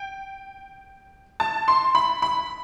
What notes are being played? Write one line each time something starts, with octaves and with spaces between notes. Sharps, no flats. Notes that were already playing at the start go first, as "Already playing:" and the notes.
Already playing: G5
A5
C6
B5
B5